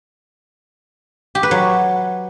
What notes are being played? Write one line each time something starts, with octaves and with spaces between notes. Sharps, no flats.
G4
B4
F#3